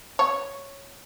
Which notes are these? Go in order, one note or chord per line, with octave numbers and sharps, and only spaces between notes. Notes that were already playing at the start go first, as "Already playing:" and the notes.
C#5